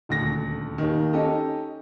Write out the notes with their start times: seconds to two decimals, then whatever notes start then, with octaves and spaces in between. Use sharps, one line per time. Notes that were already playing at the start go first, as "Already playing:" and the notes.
0.09 D#1 D2 D3 A#6
0.78 D#2 D#3
1.13 C#4 D#4 G4 A4 D#5